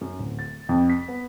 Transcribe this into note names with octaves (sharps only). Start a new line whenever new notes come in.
F#2
D1
A6
F2
B6
B3